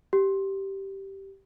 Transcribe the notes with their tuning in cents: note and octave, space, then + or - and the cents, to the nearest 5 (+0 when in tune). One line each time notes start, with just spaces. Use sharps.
G4 -10